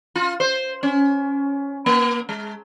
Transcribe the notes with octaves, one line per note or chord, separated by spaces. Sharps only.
F4
C5
C#4
A#3
G#3